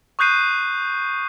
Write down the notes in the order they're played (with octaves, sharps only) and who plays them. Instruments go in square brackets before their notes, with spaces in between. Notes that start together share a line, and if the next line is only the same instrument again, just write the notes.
[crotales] C#6 D#6 F#6 G6 C7 D#7